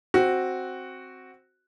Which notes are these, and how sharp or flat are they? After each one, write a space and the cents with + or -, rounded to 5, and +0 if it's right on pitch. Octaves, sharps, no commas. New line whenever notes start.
C4 +5 F#4 +0